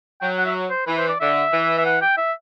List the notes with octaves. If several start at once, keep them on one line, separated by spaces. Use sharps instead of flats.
F#3 G5
F#5
E5
C5
E3 B4
C5
D5
D3 E5
E3
E5
F#5
G5
E5